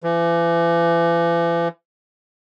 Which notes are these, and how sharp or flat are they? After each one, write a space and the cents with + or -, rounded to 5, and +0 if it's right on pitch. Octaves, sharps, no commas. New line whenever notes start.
E3 +40